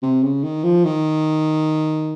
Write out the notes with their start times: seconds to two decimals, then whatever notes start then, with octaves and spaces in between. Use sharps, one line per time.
0.03 C3
0.23 C#3
0.43 D#3
0.64 F3
0.85 D#3